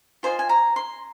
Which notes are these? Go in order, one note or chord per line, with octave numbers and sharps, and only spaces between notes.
F4 C5 D#5 G#5
G#5
A#5
C6